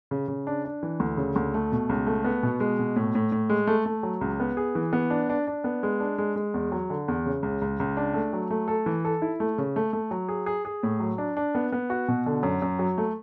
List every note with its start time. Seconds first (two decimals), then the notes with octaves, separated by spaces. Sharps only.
0.11 C#3
0.28 C#3
0.47 D4
0.65 D4
0.83 E3
1.00 D2
1.17 C#3
1.36 D2
1.54 A3
1.72 B2
1.89 C#2
2.07 A3
2.25 B3
2.43 B2
2.60 G#3
2.79 B2
2.96 A2
3.15 A2
3.32 A2
3.50 G#3
3.67 A3
3.86 A3
4.03 F#3
4.21 C#2
4.40 B3
4.57 G#4
4.75 E3
4.93 B3
5.10 D4
5.29 D4
5.47 D4
5.64 B3
5.83 G#3
6.00 D4
6.18 G#3
6.36 G#3
6.54 E2
6.72 F#3
6.90 D3
7.08 E2
7.26 C#3
7.43 C#2
7.61 C#2
7.80 C#2
7.97 D4
8.14 A3
8.33 F#3
8.51 A3
8.68 A4
8.86 E3
9.05 A4
9.22 E4
9.40 A3
9.58 C#3
9.76 A3
9.93 A3
10.11 F#3
10.29 G#4
10.46 G#4
10.65 G#4
10.83 A2
11.00 F#3
11.18 D4
11.37 D4
11.55 B3
11.72 B3
11.90 F#4
12.08 B2
12.26 D3
12.43 F#2
12.62 F#2
12.79 F#3
12.98 A3